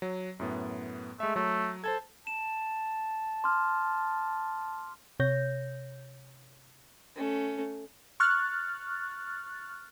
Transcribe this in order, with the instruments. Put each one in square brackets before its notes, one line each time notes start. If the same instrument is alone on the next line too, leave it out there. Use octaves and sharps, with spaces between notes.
[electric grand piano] F#3
F#2 A2 B3
[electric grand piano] G#3 E5 [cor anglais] A3
[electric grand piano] F#3 [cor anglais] A3
[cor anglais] A4 [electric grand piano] C5 A5 G#6
[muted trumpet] A5 [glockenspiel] E7
[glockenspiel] C6 D6 F6
[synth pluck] C3 C#5 G6 A#6
[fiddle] A3 C#4
[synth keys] C#6 F6 F#6 A6